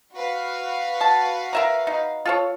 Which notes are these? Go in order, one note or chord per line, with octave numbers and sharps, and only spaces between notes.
F#4 B4 F5
A5
A#4 E5 A#5
D#4
F4 A4 C#5